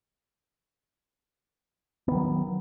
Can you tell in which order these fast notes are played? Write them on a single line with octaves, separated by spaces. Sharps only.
B3 D#3 F#3